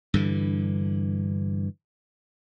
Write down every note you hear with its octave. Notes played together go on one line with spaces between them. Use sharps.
G2 D3 E3